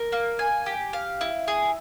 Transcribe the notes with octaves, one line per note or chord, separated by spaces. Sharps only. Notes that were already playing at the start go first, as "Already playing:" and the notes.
Already playing: A#4
A#3
G#5
G4
F5
E4
G#4